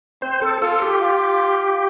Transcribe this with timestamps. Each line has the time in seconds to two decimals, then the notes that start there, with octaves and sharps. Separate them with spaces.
0.22 C4 C5
0.42 A4
0.62 F4 A4
0.82 G4
1.02 F4